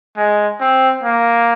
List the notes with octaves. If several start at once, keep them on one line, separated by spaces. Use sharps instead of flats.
G#3
C4
A#3